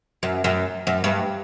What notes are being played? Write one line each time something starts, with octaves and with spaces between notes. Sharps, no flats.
F#2
F#2
F#2
G2